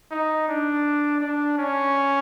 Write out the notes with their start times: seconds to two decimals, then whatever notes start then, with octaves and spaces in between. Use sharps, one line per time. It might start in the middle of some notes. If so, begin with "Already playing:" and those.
0.11 D#4
0.48 D4
1.21 D4
1.58 C#4